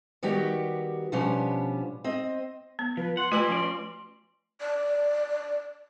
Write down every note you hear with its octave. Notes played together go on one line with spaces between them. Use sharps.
D#3 G3 B3 F#4 G4 G5
B2 F3 G3 B3 C#4 D4
C4 D#5
B3
F3 B4
F#5 C6
A3 E4 F4 G4 B4 F#7
F3 C#4 D5
D5